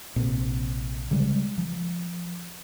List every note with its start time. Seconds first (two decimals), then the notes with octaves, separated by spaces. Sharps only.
0.16 A#1 C3
1.11 C#3 G3 G#3
1.58 F3